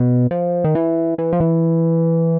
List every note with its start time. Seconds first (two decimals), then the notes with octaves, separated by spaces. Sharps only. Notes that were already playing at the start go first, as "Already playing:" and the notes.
Already playing: B2
0.31 F3
0.64 D#3
0.75 E3
1.18 E3
1.33 F3
1.40 E3